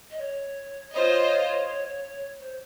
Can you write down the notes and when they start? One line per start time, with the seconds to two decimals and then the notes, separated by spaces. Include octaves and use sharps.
0.11 D#5
0.19 C#5
0.92 F4 C5 C#5 D#5
2.40 C5